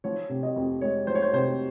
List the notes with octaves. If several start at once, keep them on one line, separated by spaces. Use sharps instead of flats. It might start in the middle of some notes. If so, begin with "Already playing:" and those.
F3 C#5
C3
D#5
F2
G#3 C#5
F3 C5
C#5
C5
C3 C5